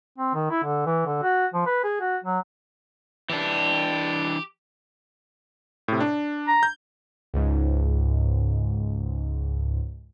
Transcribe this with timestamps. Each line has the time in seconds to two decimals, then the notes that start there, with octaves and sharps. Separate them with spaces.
0.18 C4
0.34 D#3
0.51 E4
0.63 D3
0.86 E3
1.06 D3
1.22 F#4
1.54 F3
1.66 B4
1.84 G#4
2.01 F#4
2.24 F#3
3.30 E3 D4 G4
5.88 A2 C3
6.00 D4
6.48 A#5
6.63 G6
7.34 C#2 G#2